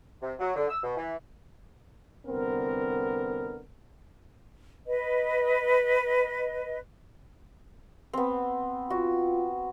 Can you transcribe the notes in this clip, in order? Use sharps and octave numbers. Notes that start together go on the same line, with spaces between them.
C3
F#3
D3
E6
B2
E3
C2 D3 B3 C4 A#4
B4 D#5
B3 C4
F4 F#4